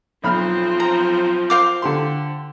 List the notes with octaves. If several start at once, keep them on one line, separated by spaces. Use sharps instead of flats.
B1 F3 C4 B5 F6
A#5
C5 F5 D6
D3 G4 C6